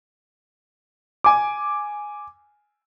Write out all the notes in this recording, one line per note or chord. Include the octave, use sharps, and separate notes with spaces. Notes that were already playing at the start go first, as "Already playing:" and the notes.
G#5 D6